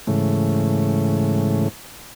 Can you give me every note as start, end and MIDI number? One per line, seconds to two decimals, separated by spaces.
0.07 1.68 44
0.07 1.68 49
0.07 1.68 52
0.07 1.68 57